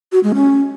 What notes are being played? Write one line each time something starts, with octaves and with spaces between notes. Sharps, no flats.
F#4
G#3
C#4